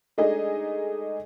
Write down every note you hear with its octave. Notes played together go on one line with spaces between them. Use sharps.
G#3 A3 D4 D#4 G#4 D#5